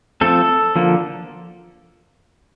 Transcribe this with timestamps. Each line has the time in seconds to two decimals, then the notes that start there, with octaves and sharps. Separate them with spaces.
0.21 F3 A3 C4 A4
0.76 D3 F3 A#3